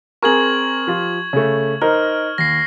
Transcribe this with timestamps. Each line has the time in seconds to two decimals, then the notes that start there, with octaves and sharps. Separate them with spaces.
0.23 C4 G#4 A#4 C#6 G#6 F#7
0.87 F3 F4 G4
1.33 C#3 A3
1.82 D#4 A#4 C5 F6
2.38 D#2 A#6 C7